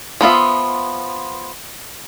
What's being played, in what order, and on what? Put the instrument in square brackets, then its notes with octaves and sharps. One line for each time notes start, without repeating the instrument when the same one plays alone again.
[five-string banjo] F3 B3 F4 E5